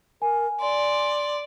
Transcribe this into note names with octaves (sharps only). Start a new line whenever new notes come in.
A#4 G#5
D5 C6